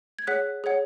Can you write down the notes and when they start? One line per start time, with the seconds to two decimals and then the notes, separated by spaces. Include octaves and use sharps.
0.19 G#6
0.27 G#4 C#5 F#5 F#6 B6
0.64 G#4 C#5 F#5